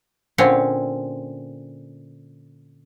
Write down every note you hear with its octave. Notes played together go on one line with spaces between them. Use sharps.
A#2 D3 C4 C#4 C#5